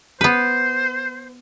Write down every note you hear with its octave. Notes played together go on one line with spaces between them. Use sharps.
B3 B4 C5